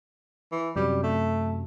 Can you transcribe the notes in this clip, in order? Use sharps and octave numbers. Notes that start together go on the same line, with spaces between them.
E3
F#2 C3 F#3 G3
A3